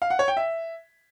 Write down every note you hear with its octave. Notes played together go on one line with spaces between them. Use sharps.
F5
F#5
C#5
G5
E5